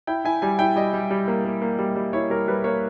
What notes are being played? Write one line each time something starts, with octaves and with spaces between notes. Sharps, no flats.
E4 G5
E4 G#5
G3 G#5
E4 G5
G3 D#5
G3
G3
A#3
A#3
A#3
G3
G3
E4 C#5
G3 A#4
G3 B4
A#3 C#5